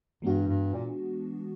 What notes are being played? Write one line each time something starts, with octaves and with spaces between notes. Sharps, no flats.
G2 E3 G#3 B3 D4 F#4
G2
A#2